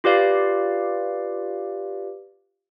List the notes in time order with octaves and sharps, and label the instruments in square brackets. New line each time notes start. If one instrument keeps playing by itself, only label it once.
[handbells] F4 G4 B4 D5 F5